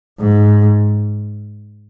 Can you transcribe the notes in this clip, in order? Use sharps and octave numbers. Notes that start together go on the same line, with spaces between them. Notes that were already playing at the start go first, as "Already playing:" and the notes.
G#2